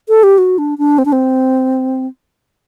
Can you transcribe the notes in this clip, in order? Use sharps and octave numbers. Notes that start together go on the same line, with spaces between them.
A4
G4
F#4
D4
D4
C4
D4
C4